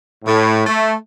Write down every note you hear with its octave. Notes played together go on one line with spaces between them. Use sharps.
A2
A3